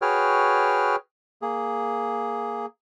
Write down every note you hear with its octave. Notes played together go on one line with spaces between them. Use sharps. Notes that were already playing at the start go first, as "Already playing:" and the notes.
F#4 G#4 B4 C#5 G5 F6
A#3 G#4